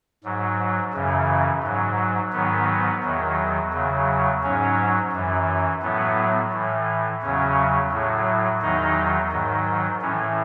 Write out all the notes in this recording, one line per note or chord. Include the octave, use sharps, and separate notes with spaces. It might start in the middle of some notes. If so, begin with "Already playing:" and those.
G#2 F#3
F#2 C#3 E3
G#2 F#3
G#2 D#3 F#3 B3
E2 D#3 F#3
E2 C#3 F#3
G#2 F#3 C#4
F#2 E3
A2 F#3 B3
A2 E3
E2 C#3 F#3 C#4
A2 F#3
E2 D#3 F#3 D#4
G#2 D#3 F#3
A2 E3 C#4